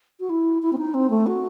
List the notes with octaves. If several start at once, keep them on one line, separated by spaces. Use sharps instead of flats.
F#4
E4
E4
C4
D#4
C4
A3
F#4